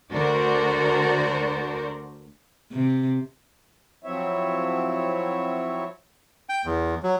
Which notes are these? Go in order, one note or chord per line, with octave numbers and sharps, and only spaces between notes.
D2 D4 F#4 A#4 C5 D5
C3
F3 F#3 C4 E4 C#5 E5
G5
E2
F#3